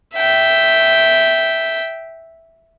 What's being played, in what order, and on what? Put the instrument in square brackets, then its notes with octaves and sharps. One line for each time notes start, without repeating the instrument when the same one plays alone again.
[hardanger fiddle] E5 G5